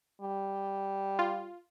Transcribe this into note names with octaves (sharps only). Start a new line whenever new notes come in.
G3
F4